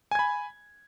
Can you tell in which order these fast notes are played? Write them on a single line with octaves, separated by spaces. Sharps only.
G#5 G#6 B5